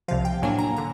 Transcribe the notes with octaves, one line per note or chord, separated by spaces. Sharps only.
C2 C3 F3 F5
G5
A2 F#3 A#3 D4 G#5
A#5
D3 A#5